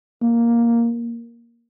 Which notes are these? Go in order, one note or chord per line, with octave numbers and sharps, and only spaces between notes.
A#3